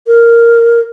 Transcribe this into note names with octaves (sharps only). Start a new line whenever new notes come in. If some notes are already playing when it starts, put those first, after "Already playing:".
A#4